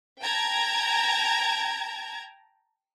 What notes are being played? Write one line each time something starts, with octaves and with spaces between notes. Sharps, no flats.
G5 A5 A#5 G#6